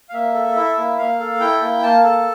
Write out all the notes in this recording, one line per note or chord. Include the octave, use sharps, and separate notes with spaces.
F5
A#3 E5
A4
E4 E5
A#3
A#3 F5
A4
E4 G5
A#3
A#3 A5
A4